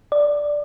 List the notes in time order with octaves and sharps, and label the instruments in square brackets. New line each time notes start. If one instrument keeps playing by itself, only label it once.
[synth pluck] D5